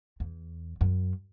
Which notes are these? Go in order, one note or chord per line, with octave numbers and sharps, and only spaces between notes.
E2
F#2